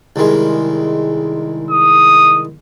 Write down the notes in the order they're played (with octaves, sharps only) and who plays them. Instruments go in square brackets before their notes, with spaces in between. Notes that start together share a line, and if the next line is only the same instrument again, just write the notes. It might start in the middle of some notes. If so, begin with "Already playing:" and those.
[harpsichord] C2 D#3 G#3
[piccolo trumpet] D#6